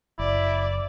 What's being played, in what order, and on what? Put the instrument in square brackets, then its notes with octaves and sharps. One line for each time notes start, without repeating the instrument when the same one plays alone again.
[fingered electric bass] F#1 [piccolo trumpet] E4 [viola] D5